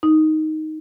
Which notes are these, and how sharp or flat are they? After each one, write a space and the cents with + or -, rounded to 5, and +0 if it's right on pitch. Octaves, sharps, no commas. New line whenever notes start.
D#4 +5